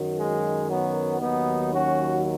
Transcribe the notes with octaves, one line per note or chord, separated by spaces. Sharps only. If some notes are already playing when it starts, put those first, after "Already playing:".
Already playing: F#2 D#3 F#3
G#3
F#3 B3
D#2 D#3 F#3 B3 D#4
C#4 F#4